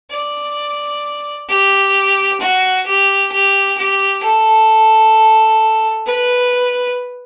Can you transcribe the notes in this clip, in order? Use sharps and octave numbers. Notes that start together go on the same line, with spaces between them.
D5
G4
F#4
G4
G4
G4
A4
B4